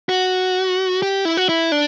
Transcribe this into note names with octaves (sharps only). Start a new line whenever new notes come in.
F#4
G4
E4
F#4
E4
D4